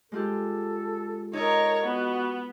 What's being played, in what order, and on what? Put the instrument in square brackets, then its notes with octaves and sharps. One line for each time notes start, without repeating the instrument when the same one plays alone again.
[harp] G#3 F4 G4 [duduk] A4
[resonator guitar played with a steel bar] D#4 A4 D#5 [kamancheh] A#4 C#5
[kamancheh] B3 [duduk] F#4